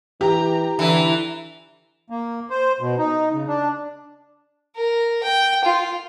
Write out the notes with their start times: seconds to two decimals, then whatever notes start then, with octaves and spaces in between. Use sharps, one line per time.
0.21 E3 G4 A#5
0.79 D3 E3 E4 A#5
2.10 A#3
2.50 C5
2.81 B2
2.98 D#4
3.32 C#3
3.48 D4
4.76 A#4
5.23 G5
5.65 F4